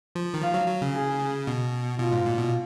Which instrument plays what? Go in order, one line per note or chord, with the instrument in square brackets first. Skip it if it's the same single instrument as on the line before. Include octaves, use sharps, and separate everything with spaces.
[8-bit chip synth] F3
D#3
[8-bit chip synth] F3 [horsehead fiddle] F5
[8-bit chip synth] F#3
F#3
C#3
[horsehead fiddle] G#4
[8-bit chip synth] B2
[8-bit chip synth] B2 [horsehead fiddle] F4
[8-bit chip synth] G#2
A#2
B2